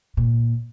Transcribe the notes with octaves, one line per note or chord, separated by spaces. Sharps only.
A#2